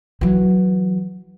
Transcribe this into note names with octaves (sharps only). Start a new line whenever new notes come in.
E3 F#3